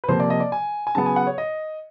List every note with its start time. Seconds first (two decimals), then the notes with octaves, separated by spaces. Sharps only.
0.04 B4
0.08 C3 F3 A#3 C5
0.20 D5
0.30 D#5
0.40 D5
0.52 G#5
0.87 G#5
0.95 C#3 F#3 B3 A5
1.06 G#5
1.16 F#5
1.27 C#5
1.38 D#5